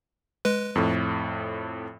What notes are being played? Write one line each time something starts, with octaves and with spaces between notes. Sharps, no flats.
G#3 B4
F2 A2